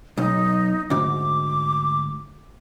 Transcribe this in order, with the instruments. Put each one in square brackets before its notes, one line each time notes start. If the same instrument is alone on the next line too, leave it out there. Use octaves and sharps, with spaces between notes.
[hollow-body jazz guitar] B1 [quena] D#4
[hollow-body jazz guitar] D2 G#2 [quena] D6